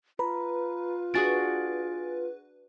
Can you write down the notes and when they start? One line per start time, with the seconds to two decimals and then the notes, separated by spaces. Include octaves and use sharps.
0.19 F4 B4 A#5 B5
1.14 D4 F#4 G#4 G#5 A6 D7